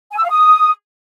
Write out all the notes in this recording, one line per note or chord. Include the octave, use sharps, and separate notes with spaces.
G#5
E6
F5
D#6